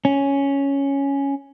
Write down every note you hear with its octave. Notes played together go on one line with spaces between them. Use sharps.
C#4